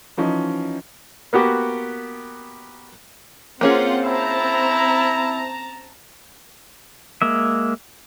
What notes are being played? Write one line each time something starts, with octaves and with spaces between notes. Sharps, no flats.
E3 F3 C#4 D#4
A#3 B3 F#4 G4
A#3 C4 C#4 F4 G#4 F#5
E4 A5 A#5
G#3 A#3 E5